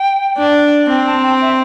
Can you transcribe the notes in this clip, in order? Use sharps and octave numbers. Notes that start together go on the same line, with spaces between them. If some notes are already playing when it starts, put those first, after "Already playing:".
Already playing: G5
D4
C4 G5
A5
G5
E5